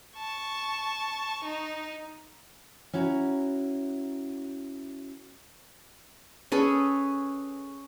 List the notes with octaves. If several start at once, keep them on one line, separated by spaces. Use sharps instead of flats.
A5 C#6
D#4
C#4 E4 F#4 A#5
C#4 G#4 A4 B4